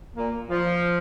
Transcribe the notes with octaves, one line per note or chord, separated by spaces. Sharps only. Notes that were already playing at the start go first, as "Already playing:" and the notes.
A#2 A#3
F3